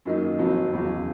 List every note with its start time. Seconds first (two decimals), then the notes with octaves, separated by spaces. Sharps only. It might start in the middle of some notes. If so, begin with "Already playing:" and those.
0.05 F#2 D#3 F#3 A#3 D#4
0.38 F1 F2 C3 D#3 F#3
0.71 F1 E2 C#3 F#3